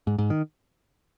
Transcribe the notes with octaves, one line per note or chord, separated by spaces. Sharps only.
G#2
G#2
D#3